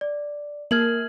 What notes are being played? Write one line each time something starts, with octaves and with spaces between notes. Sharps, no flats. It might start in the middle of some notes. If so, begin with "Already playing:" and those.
D5
A#3 A#4 F6 G#6 F#7